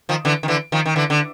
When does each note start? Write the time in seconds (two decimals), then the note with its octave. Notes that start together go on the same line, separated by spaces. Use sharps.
0.09 D#3 F3
0.25 D3 E3
0.43 D#3
0.48 D3 E3
0.72 D#3 F3
0.86 D#3
0.96 D3 E3
1.10 D3